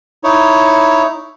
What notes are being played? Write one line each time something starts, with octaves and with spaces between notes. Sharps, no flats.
D#4 E4 C#5